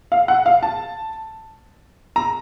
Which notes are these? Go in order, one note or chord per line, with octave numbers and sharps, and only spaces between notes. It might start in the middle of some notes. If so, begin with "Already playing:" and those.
F5
F#5
F5
A5
A#5